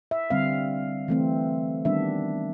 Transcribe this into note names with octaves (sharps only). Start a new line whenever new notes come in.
E5
D3 G3 C4 F5
E3 A3 C4
D#3 G3 B3 D4 E5